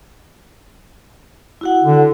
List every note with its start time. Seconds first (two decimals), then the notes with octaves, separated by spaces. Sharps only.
1.61 E4 F#4 F#5
1.84 D3